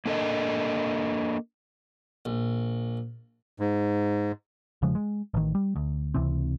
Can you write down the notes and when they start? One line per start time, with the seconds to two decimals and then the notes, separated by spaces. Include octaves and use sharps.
0.06 A#3 D4 A4 A#4 D#5
2.25 A#1
3.60 G#2
4.82 E1 C#3 F3 G#3
4.95 G#3
5.34 A1 D#3
5.55 G3
5.76 D2
6.14 C#2 C3 E3 C4